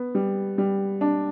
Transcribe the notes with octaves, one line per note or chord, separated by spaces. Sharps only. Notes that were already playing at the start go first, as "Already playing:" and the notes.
Already playing: B3
G3
G3
D4